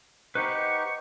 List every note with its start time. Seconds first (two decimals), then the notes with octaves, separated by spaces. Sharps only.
0.35 D#4 G4 B4 C5 F#5 C#6